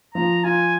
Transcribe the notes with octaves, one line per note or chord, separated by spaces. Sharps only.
F3 A#5
F4 G#5